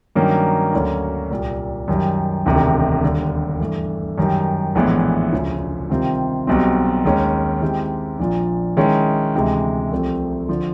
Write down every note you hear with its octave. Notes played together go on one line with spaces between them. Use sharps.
G2 D#3 F#3 A#3 C#4
D2 D3 F#3 A#3 C#4
C2 A#2 G3
F#2 D#3 G3
E1 D2 C3 D#3
D#2 D3 G3
G2 E3 A3
F#2 D#3 G3
A#1 A2 E3 G#3 B3
E1 D2 C#3 F3
C3 D#3 G3 C4 F4
B1 B2 G3 C4
D#2 D#3 G#3 C#4
D#3 G#3 C4 E4 G4
A#1 A#2 F3
D#3 G#3 C#4 E4
D2 C3 E3 G#3
C2 C3 F3 A3 C4
D3 F3